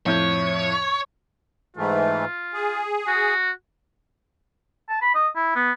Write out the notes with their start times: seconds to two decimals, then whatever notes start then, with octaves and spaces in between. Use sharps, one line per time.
0.06 F2 A2 C#5 G6
1.77 G#2 E3 A3 F4
2.54 G#4
3.08 F#4
4.89 A5
5.01 B5
5.15 D#5
5.36 E4
5.56 B3